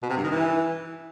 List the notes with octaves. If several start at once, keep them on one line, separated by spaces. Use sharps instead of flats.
B2
C3
G2
D#3
E3